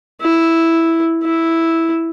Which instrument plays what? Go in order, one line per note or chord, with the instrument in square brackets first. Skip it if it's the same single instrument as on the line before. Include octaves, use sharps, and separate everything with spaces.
[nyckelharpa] E4
E4